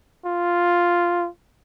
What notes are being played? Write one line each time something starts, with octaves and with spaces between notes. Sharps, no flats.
F4